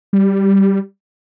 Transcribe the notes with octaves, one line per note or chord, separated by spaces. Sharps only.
G3